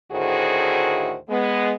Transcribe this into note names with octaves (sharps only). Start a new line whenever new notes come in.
D2 A2 D#3 F#4 G#4 C5
G#3 B3